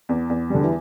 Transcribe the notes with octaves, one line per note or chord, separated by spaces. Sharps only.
E2
E2
D3 G3
E3